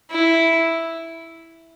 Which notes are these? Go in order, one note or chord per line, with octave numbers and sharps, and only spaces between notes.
E4